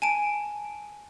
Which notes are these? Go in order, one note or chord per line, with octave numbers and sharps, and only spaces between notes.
G#5 A5 D7